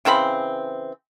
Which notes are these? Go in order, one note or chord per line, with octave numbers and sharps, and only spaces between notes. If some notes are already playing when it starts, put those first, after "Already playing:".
C#3 E3 C4 B5